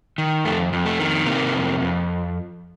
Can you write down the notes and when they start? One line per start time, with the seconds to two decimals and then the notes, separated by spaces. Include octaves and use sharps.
0.18 D#3
0.45 F2 A3
0.73 F2
0.86 A3
1.00 D#3
1.26 C3 A#3
1.53 F2
1.81 F2